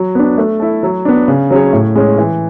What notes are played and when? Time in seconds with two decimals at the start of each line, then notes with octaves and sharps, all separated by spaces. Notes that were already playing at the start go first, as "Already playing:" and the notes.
Already playing: F#3
0.15 B3 D4
0.38 A3
0.60 E4 A4
0.83 F#3
1.05 B3 D4
1.28 C#3
1.51 F#3 C#4 G#4 C#5
1.73 A2
1.95 G#3 C#4
2.18 E3